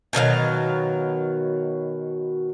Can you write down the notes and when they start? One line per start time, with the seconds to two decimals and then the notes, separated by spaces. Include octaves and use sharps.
0.13 B2 D#3 F#3 F5